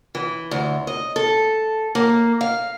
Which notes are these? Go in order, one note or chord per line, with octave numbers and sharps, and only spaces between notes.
E3
D2
D#5
A4
A#3
F5